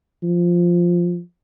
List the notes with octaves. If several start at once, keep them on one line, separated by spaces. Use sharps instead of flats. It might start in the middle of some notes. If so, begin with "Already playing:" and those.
F3